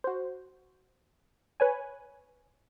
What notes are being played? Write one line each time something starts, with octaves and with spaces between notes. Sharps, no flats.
F#4 C5
B4 C#5 G#5